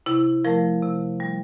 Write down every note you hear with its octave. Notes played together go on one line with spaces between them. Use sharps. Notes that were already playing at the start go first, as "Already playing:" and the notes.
C3 E4
F3 A3 A#4
C3
G3